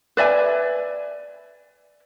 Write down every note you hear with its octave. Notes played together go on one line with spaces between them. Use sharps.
B4 D5 E5 G#5